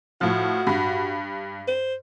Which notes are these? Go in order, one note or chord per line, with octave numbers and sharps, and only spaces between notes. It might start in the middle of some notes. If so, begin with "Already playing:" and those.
A2 F3 F#4
G2
C5